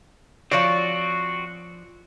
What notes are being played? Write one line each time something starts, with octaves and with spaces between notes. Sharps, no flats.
F3 C4 F#4 C#5 D5